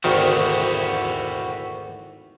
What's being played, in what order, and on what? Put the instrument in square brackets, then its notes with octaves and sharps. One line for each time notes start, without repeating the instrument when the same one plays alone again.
[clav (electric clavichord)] G#1 D2 D#3 [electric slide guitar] E4 F#4 G4